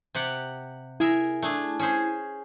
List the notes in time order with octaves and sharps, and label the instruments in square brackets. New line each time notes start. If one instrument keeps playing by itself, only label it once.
[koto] C3 G4 F#5
[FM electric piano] E4 [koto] G#4 A#4 E5
[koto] A3 D4 G#4
C#4 G#4 C5